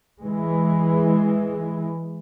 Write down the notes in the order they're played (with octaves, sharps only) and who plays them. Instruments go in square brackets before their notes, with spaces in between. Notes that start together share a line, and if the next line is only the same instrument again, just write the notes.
[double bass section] E3 G#3